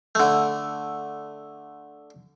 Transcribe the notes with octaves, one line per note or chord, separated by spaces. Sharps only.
D3 A3